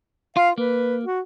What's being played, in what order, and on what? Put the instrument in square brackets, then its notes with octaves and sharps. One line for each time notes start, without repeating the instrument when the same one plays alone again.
[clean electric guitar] F4 [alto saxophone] F5
[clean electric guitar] A#3 [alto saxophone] B4
[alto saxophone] F#4